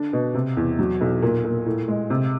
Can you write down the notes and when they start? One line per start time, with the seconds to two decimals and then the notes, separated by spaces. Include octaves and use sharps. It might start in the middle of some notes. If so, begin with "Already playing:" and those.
Already playing: D3 D4
0.13 B2
0.34 C3
0.57 E2
0.79 F#3
1.01 B1
1.22 A#2
1.45 A#2
1.66 A2
1.88 G#3
2.10 C3